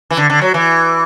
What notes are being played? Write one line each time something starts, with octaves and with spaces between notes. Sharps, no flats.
E3
D3
D3
F#3
E3